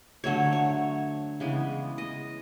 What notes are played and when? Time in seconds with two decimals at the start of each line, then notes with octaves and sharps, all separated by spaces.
0.24 D3 F#3 A3 C#5
0.53 C#5
1.40 C#3 E3 G#3 B3
1.98 D#5